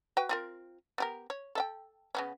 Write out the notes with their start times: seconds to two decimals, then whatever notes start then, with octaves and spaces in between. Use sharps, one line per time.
0.17 F#4 B4 G5
0.29 C4 F4 A#4
0.98 B3 G4 A#4
1.30 C#5
1.55 A4 E5 G5
2.15 C#3 B3 C#4